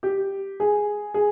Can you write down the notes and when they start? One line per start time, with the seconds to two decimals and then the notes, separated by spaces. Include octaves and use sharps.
0.03 G4
0.60 G#4
1.14 G#4